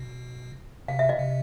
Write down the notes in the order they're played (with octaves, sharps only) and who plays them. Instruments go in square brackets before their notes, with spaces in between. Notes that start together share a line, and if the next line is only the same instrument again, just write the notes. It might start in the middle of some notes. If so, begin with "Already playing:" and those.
Already playing: [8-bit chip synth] B2
[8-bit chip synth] C3 [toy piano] F5
[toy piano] E5
D#5 F5
[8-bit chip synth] C3